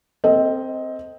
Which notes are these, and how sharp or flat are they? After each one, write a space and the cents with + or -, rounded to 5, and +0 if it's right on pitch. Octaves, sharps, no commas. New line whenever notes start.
C4 +0 A4 +35 D#5 +15